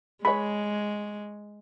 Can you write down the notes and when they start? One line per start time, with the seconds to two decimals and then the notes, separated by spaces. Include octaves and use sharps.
0.25 G#3 G#4 C#5 B5